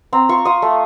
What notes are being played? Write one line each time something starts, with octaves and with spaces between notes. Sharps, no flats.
C4 A#5
F4 C#6
F4 D#6
A3